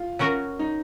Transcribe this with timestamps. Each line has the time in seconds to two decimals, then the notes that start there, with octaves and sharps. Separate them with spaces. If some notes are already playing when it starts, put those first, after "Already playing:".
Already playing: F4
0.19 F#3 C#4 F#4 A#4
0.59 D#4